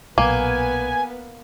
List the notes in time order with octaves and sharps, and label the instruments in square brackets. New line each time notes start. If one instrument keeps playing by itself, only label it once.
[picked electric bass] B1 A#2 [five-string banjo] A#3 [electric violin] B3 B4 [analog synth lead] G#5